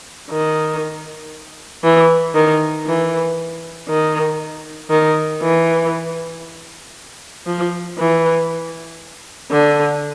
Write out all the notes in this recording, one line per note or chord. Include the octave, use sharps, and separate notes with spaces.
D#3
E3
D#3
E3
D#3
D#3
E3
F3
E3
D3